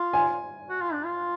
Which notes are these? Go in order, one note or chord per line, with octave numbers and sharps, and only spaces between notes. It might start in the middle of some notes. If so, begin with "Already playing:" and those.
Already playing: F4
G#5
F#4
F4
D4
F4